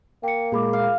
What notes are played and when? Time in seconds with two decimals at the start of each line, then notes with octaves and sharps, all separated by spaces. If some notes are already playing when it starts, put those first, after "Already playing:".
0.23 A#3 G5 C#7
0.52 A#2 G#3 G#4 B5 D6
0.73 F5